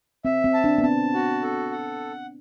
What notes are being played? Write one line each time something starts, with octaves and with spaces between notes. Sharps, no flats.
C4 E5
C4
A5
D4
B3
C4 A5
F#4
A4
F#5